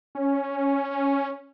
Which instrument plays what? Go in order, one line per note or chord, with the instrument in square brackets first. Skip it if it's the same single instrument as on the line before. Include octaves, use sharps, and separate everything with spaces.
[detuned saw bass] C#4